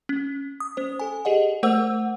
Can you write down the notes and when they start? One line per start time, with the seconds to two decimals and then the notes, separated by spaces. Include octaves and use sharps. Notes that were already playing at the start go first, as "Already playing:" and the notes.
0.09 C#4
0.60 D#6
0.77 C#4 C5
1.00 A4 G#5
1.25 G4 G#4 D#5 F#5
1.63 A3 A#4 C5 F#5 E6